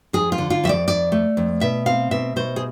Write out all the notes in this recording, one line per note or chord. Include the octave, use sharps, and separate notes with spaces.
F2 G#4
F4
D3
F4
F2 E5
D5
F2 D5
A3
F2
B2 E5
C4 F5
B2 E5
B2 C5
G#4